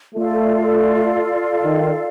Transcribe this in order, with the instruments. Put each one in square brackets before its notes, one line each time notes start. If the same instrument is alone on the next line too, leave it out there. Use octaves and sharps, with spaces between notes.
[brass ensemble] A3 [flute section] F4 A4 D5 F5
[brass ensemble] D#3